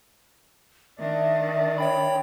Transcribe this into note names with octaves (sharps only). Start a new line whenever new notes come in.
D#3 D4 E5
C#5 G5 B5